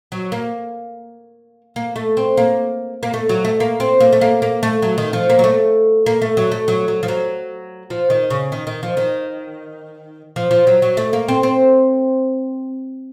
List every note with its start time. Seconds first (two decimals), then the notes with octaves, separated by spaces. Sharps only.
0.12 F#3
0.32 A#3
1.76 A#3
1.96 A3
2.17 C4
2.37 A#3
3.03 A#3
3.14 A3
3.29 F#3
3.45 A3
3.60 A#3
3.80 C4
4.00 A#3
4.13 A3
4.21 A#3
4.42 A#3
4.63 A3
4.82 F#3
4.98 D#3
5.13 F3
5.30 A#3
5.39 F#3
5.44 A3
6.06 A#3
6.22 A3
6.37 F#3
6.52 A3
6.68 F#3
6.88 F#3
7.03 F3
7.08 F#3
7.90 F3
8.10 D#3
8.30 C#3
8.52 D#3
8.67 D#3
8.83 F3
8.97 D#3
10.36 F3
10.51 F3
10.67 F#3
10.82 F#3
10.97 A3
11.13 A#3
11.28 C4
11.43 C4